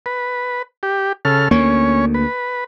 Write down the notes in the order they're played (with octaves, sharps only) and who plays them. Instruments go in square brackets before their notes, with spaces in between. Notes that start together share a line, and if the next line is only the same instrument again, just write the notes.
[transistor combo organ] B4
G4
C#3 A4 F6
[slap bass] D2 A#3 [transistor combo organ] C#4 C#5
[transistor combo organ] B4